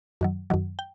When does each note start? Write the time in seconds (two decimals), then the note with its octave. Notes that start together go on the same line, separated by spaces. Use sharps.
0.21 F#2 D#3 F#3
0.50 F#2 D#3 F#3
0.79 G5